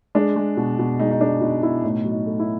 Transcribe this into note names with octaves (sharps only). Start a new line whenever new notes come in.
G#3 D4
G#3
B2
B2
G#3 D#4
D#4
G#3 D4
B2 D#4
B2 E4
A2 D#4
F#3
D#4
A3
E4